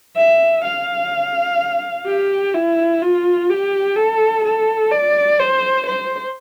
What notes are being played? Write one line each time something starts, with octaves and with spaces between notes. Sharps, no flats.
E5
F5
G4
E4
F4
G4
A4
A4
D5
C5
C5